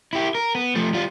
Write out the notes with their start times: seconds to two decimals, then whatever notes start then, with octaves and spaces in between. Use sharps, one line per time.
0.13 E4 G4
0.35 A#4
0.55 B3
0.76 F3 A3
0.93 G3 F4